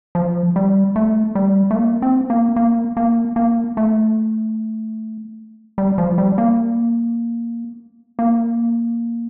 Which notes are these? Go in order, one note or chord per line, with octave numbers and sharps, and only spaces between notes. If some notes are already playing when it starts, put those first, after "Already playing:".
F3
G3
A3
G3
A3
A#3
C4
A#3
A#3
A#3
A#3
A3
G3
F3
G3
A#3
A#3